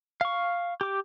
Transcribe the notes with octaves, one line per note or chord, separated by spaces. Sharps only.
F5 C#6
G4 D6